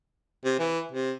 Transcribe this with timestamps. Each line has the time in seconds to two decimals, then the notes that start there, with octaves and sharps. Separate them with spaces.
0.45 C3
0.59 E3
0.92 C3